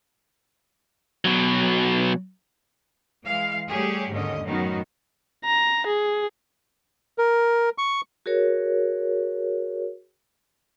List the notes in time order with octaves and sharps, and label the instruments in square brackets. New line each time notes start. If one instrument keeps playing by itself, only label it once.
[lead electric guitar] B2 F#3
[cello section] E3 G#3 F5
G3 A3 G4 G#4 C#5
D#2 G#2 D3 C#4 D#5
F#2 A2 D#3 B3 D#4 F#4
[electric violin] A#5
G#4
[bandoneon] A#4
C#6
[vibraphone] F#4 G#4 A#4 C#5